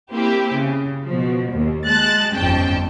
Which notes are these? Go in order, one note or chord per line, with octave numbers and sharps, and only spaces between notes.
A#3 C4 E4 G4
C#3
B2 F3
D#2
G#3 A5 F#6 A6
G1 F2 G#2 C#4 G5 A5